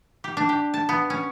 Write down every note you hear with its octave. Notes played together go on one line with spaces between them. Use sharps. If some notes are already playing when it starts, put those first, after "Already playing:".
G4
D4
G4
A5
B3
C#4